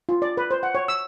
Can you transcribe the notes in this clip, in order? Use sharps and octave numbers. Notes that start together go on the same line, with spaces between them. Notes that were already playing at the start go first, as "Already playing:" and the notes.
F4
D5
B4
C5
F#5
C#5
E6